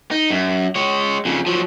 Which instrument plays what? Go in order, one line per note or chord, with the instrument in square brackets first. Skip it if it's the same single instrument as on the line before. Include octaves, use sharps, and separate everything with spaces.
[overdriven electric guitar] D#4
F#2
G#3 C#5
F2 C#3
F3 F#3